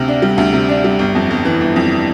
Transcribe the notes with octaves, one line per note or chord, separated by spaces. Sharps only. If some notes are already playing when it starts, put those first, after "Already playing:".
Already playing: D2 C3
D4
G3
D2
C3
D4
G3
G1
F2
G1
E3
G1
F2